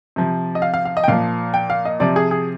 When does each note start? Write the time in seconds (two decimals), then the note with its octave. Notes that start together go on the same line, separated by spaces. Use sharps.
0.16 C3 F3
0.55 D#5
0.62 F5
0.74 F5
0.85 F5
0.97 D#5
1.04 G5
1.08 A#2 F3 F5
1.54 G5
1.70 F5
1.85 D#5
2.00 C3 F3 D5
2.16 G#4
2.31 G#4